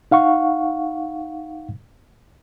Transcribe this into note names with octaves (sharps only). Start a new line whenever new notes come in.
D#4 F5 F#5 C#6